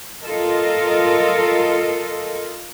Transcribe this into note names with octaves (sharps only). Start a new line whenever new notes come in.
F4 A4 A#4 D#5